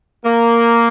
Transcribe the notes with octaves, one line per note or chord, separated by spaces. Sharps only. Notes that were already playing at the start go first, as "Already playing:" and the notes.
A#3